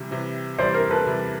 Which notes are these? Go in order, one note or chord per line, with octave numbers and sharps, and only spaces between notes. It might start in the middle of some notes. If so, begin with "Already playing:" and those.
Already playing: C3 E3 G3
C3 E3 G3
C3 E3 G3 C5 D5
A#4 C5
A4 B4
C3 E3 G3